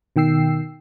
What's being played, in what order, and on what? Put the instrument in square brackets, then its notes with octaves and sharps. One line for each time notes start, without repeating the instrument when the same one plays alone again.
[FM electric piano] B2 D#3 G5 E6 C7